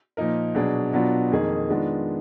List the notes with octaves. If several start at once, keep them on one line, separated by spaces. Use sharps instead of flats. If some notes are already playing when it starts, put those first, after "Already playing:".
A#2 F3 A#3 D#4 A#4
B2 F#3 D4 G#4
B2 F#3 B3 D4 F4
F2 D#3 A#3 D#4 G#4
D#3 G#3 B3 D4 F4